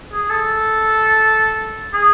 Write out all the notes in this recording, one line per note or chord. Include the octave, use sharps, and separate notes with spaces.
G#4
A4
G#4